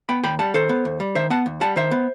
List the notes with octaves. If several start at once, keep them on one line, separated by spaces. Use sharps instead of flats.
B3 G5 B5
D#2 G5 B5
G3 F#5 A5
D#3 A4 C5
B3
D#2
G3
D#3 C5 E5
B3 F#5 A5
D#2
G3 F#5 A5
D#3 C5 E5
B3